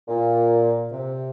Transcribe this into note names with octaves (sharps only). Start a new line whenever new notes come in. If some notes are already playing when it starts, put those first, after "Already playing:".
A#2
C3